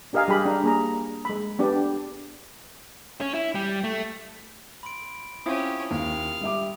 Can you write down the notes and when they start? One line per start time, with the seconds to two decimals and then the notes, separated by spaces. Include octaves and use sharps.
0.13 D4 G4 A#4 D#5 F5 G#5
0.28 G3 G4 G#4 B5
0.46 D4 A#5
0.64 A#3 G#4 A#5
1.25 G#3 B5
1.59 B3 D4 G4 D5
3.21 C#4
3.34 E4
3.55 G3
3.84 A3
4.83 B5 C6 D7
5.46 C4 C#4 E4 F4 G4 D#6
5.91 D#2 F5
6.41 G3 E5 D6